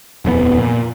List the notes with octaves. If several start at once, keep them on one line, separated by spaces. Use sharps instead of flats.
D#1 F2 E3 B3
A#2